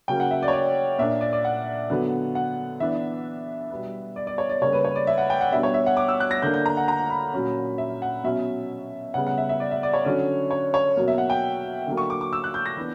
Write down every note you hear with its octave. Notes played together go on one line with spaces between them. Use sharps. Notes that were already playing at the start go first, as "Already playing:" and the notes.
C#3 F#3 A#3 C#4 G5
F#5
E5
D5
C#5
D5
A#2 A#3 D4 E5
D5
D5
F#5
D3 F#3 B3
F#5
E3 B3 D4 E5
B2 G3 B3
D5
D5
C#5
D5
C#3 G3 A#3 C#5
B4
C#5
D5
E5
F#5
G5
F#5
B2 G3 B3 D4 E5
C#5
E5
F#5
D6
E6
F#6
A#6
D3 A#3 D4 G6
G6
A#5
F#5
A#5
B5
A#2 F#3 C#4
E5
F#5
B2 F#3 C#4 E5
C#3 G3 B3 F#5
F#5
E5
E5
D5
E5
D5
C#5
D3 F#3 C#4
C#5
C#5
B2 F#3 A#3
E5
F#5
G5
D3 F#3 A#3
C#6
D6
D6
E6
F#6
G6
A#6
E3 B3 D4